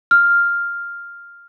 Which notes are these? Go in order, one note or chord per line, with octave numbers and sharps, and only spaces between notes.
F6